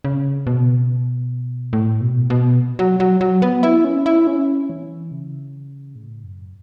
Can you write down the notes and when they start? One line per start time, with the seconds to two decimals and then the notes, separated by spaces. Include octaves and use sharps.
0.05 C#3
0.47 B2
1.73 A2
2.01 B2
2.30 B2
2.79 F#3
3.00 F#3
3.21 F#3
3.42 B3
3.63 E4
3.85 C#4
4.06 E4
4.27 C#4
4.70 E3
5.12 C#3
5.95 A2
6.24 F#2